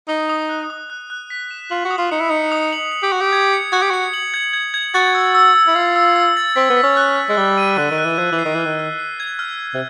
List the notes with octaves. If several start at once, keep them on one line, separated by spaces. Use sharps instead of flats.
D#4 D#6
D#6
F#6
D#6
F#6
F#6
B6
E7
F4 F#7
F#4
D#6
F4
D#4 C#7
E4
D#4 C#7
D#6
F#7
C#7
G4
F#4 F#7
G4
G#6
C#7
F#4 G#6
G4
F#4 C#7
F#7
G#6
G#6
G#6
F#4 A6
E6
E6
E6
E4
F4 E6
E6
E6
A6
C4 B6
B3
B6
C#4
F#6
F#6
G#3
G3 G7
D#7
D3 F#6
D#3
F#6
E3
F3 G#6
E3
C7
D#3
E3 F6
D#3
F6
C7
G#6
F6
F6
C3